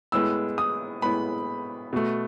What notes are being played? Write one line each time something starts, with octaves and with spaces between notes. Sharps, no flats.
A2 G#3 B3 E6
D#6
A2 G#3 B3 B5
B2 A3